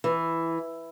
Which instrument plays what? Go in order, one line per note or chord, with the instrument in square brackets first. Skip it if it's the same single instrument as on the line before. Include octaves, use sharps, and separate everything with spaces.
[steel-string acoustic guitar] E3